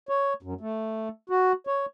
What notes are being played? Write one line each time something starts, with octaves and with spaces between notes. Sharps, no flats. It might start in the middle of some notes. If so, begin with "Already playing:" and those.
C#5
F#2
A3
F#4
C#5